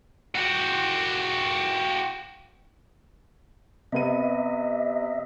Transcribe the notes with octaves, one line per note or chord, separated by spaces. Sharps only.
F#4 G4
C3 B3 D#5 E5 D#7